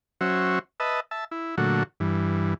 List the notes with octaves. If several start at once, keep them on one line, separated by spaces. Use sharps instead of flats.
F#3 C#4 F#4 C5 E5
B4 D#5 E5 A5
E5 A5
E4
A#2 D3 F#3 A3 F#4
G2 E3